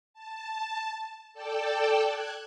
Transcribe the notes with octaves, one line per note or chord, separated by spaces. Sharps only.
A5
A4 D5 G5 A5
F#6 G#6